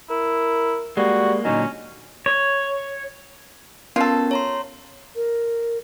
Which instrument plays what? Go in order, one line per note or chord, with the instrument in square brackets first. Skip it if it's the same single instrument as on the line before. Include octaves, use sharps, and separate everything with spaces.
[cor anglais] E4 [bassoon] A#4
[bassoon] G3 [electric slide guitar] G#3 A#3 [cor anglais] F#4
[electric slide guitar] A#2 D3 F#3 [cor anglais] C#4 [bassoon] D#4
[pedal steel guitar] C#5
[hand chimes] B3 C#4 A#4 [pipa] F4 A4
[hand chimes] C#5 A#5 C6
[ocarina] A#4